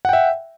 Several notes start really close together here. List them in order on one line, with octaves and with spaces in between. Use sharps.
F#5 G5 E5